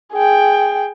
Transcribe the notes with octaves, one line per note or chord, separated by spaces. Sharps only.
G#4 G5